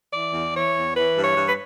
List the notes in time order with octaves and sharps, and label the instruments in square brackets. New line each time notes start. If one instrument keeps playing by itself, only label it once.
[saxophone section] E3 D5
E2
E3 C#5
E2
E3 B4
G2
C#5
G2
B4